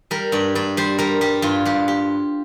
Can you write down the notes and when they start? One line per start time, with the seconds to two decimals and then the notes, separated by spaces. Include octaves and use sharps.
0.11 G3 A#4
0.32 G2 D5
0.55 G2 D5
0.77 G3 C5
0.98 G3 A#4
1.21 G3 G4
1.42 G2 F4
1.65 G2 G4
1.88 G4